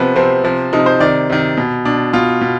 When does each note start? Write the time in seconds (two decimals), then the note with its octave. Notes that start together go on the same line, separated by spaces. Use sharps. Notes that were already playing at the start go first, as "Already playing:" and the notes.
Already playing: C3 F3 B3
0.16 C3 F3 C4
0.44 C3 F3
0.73 C3 F3 D#4
0.86 C5
1.00 C3 D#3 D5
1.29 C3 D#3
1.57 B2
1.85 B2 D4
2.13 B2 F4
2.41 B2